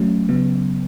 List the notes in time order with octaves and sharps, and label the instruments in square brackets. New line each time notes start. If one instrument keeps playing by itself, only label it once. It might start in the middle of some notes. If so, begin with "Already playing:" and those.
Already playing: [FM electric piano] F#3 A3 C#4
C#3 F#3 B3